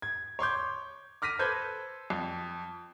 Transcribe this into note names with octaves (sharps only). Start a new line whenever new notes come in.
G#6
C#5 C6 D6 G6
D6 F6 A#6 B6 D#7
A4 B4 C5 G6 G#6
F2